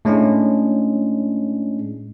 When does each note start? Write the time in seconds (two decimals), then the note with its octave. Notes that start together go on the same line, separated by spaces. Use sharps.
0.05 A2 G#3 C#4 D4